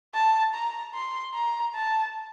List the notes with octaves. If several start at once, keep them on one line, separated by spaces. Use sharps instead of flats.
A5
A#5
C6
A#5
A5